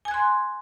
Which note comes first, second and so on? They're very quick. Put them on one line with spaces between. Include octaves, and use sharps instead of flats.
G#5 G#6 F#6 C6